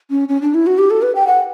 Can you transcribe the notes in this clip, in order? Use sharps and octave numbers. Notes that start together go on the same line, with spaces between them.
C#4
C#4
D4
E4
F#4
G4
A4
B4
G5
F#5